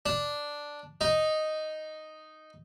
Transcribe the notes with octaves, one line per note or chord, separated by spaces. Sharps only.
D4
D#4